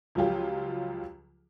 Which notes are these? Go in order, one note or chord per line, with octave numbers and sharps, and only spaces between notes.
C#2 F3 F#3 F4 G4